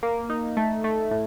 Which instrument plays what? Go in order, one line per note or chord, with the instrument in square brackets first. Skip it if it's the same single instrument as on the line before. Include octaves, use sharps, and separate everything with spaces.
[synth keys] A#3
D#4
A3
A3
A2